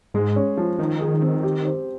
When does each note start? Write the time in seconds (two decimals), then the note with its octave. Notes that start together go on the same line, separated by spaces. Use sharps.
0.14 G#2 G#3
0.36 C#4
0.57 F3
0.79 D#3 D#4
1.01 G#4
1.22 C4
1.43 G4
1.65 C5